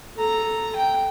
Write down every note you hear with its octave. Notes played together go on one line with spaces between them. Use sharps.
A4 A#5
G5